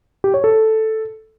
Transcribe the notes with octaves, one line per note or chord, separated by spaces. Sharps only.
G4
C#5
A4